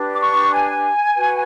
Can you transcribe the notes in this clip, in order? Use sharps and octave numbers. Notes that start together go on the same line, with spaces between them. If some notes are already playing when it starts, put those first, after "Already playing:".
Already playing: D4 G4 B4
D6
C#6
G#5
F#4 B4